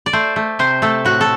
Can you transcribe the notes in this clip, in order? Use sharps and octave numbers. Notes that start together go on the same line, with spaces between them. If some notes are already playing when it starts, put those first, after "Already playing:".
D5
A3 C5
A3
C3 C5
A3 A4
A2 F#4
A4